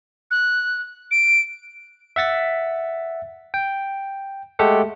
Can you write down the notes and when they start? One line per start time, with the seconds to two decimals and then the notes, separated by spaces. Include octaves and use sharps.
0.31 F#6
1.11 D7
2.16 E5 F#5 A6 B6
3.54 G5
4.59 G#3 A3 G4 A4 F#5